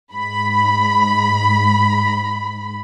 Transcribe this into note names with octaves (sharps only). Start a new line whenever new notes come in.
G#2 B5